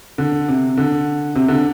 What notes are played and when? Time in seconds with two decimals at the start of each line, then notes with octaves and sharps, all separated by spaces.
0.18 D3
0.48 C3
0.77 D3
1.35 C3
1.48 D3